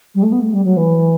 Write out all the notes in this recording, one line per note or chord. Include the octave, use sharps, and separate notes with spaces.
G3
A3
B3
A3
G3
F#3
E3